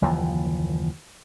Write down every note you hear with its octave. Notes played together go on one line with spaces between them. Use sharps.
F#1 D#2 E3 F3